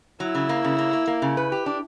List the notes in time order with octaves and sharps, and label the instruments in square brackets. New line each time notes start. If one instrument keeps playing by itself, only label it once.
[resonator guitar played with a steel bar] F#3 [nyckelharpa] E4
[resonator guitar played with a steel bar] C#3
A#3
C#3
A#3
A#3
A#3
C#3
B4
G4
D4